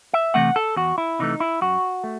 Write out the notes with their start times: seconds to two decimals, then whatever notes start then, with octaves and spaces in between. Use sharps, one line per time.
0.13 E5
0.34 C3 E3 A3 F#5
0.56 A4
0.76 E2 F#4
0.98 E4
1.19 C3 E3 A3 D#4
1.40 E4
1.61 F#2 F#4
2.04 A3